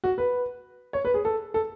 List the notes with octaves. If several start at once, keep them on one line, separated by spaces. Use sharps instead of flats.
F#4
B4
C#5
B4
G#4
A4
A4